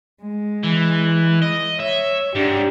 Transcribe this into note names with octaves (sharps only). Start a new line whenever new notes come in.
G#3
E3
D#5
C#5 E5
G#2 D4 G4